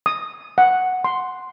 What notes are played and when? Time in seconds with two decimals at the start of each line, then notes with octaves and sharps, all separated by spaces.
0.06 D#6
0.58 F#5
1.04 C6